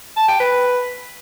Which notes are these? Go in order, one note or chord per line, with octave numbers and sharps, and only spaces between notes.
A5
G5
B4